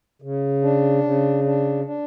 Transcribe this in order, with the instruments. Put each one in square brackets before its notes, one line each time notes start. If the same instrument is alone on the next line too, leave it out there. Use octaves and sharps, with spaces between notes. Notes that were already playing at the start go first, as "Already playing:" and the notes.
[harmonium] C#3
D4
C#3
D4
D4